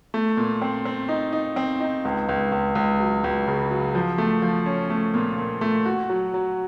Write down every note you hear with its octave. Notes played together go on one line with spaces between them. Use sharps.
A3
A#2
C4
C4
D#4
D#4
C4
D#4
C#2
C#2
C#2
C#2
F#3
C#2
C#3
F#3
F3
A3
F3
C#4
A3
A#2
A#2
A3
F#4
F#3
F#3